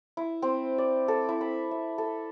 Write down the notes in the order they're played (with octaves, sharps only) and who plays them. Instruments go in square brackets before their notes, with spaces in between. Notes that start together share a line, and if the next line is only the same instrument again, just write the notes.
[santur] E4
C4
D5
A4
E4
B5
E5
A4